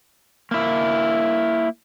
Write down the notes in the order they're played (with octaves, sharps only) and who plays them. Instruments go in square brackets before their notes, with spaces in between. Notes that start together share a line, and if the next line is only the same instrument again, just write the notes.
[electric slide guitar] A#3 E4